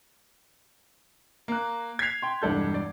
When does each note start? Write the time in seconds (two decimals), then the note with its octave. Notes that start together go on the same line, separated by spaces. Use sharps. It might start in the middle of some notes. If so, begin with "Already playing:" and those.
1.48 A#3 F#6
1.99 G#6 B6 C7 F7
2.22 G5 C6
2.42 E1 C2 G2 D4 A4 G6
2.74 D5